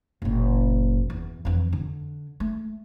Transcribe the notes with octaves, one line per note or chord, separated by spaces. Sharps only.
F#1 A#2
E2
F2 E3
D3
A3